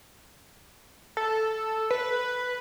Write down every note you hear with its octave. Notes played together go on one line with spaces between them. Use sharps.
A4
B4